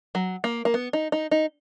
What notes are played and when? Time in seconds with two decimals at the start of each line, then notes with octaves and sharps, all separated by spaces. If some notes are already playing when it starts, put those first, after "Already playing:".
0.15 F#3
0.44 A#3
0.65 A#3
0.74 B3
0.93 D#4
1.12 D#4
1.31 D#4